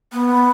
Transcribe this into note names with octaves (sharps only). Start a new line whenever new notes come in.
B3